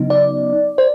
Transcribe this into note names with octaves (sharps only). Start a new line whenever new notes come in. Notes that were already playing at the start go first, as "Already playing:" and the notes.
Already playing: C#3 F#3 B3 D#4
D5
C5